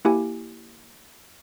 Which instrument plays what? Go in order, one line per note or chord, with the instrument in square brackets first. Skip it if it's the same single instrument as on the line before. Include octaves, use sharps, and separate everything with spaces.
[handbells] A#3 E4 G4 G#5